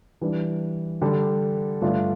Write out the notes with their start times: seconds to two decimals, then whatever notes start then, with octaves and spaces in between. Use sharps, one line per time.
0.21 E3 G3 D4
1.01 D3 G3 D4 A4
1.82 G2 D3 A3 D4 F4